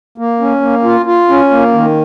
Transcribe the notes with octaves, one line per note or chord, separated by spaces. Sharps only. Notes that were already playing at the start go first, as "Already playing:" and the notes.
A#3
C#4
A#3
F4
F4
C#4
A#3
D#3